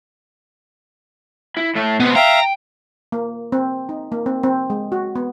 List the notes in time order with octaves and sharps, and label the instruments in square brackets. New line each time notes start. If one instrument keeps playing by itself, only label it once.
[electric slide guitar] E4
A2 A3 E5
[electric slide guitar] B2 C4 [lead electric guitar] B3
[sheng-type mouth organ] E5 F5 [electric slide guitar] G5 [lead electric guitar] A#5
[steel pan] A#3
C4
D#4
A#3
C4
C4
G#3
F#4
B3